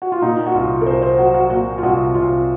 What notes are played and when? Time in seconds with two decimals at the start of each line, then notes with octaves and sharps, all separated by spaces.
0.02 F#4
0.12 F4
0.22 A#2 D#4
0.46 F#4
0.54 C2 F4
0.81 A#4
0.86 C2 C5
1.02 C5
1.18 F#3 F#4
1.34 F#4
1.50 A#2 F#4
1.78 F4
1.83 C2 F#4
2.14 C2 F4